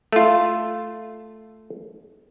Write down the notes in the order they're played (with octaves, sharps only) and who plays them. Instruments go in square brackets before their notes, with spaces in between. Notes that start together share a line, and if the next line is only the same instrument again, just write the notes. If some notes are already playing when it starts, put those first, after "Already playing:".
[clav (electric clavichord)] A3 F4